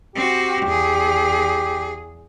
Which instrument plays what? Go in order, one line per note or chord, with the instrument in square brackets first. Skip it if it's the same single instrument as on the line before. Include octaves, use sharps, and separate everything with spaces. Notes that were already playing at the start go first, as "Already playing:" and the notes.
[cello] C4 F#4 [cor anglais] G4
[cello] E2 G#4